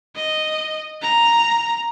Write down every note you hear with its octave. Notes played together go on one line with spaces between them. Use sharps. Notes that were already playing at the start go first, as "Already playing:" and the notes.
D#5
A#5